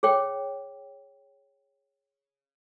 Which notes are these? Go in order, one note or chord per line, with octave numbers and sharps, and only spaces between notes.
G#4 C#5 G5